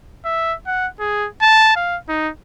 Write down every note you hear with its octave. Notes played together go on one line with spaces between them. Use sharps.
E5
F#5
G#4
A5
F5
D#4